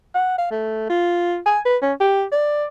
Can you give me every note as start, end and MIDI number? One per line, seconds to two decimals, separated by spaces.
0.15 0.37 78
0.38 0.46 77
0.51 0.89 57
0.89 1.39 65
1.46 1.59 80
1.65 1.77 71
1.82 1.93 61
2.00 2.24 67
2.32 2.66 74